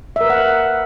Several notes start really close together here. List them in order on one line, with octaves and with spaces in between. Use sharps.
E5 A#4 B4 F#5